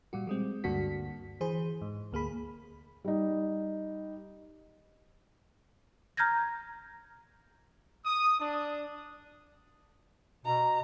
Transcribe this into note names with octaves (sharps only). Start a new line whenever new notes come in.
A#2 G3 F#4
G3 G#3 C4
D2 G2 D3 A#3 F#4 B6
E3 G#4 C5
G#2
D2 A#3 G#4 B5
G3 D#4
A#5 F6 G6 G#6 A#6
D#6
D4
B2 A#5